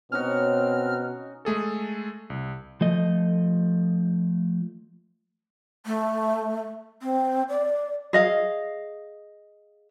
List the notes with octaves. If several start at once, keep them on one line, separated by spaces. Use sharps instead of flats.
B2 C4 C#4 D#4 F#4 F6
G#3 A3 G#4 A4
C2
F3 A3 D#5
A3
C4
D5
G#4 D#5 F5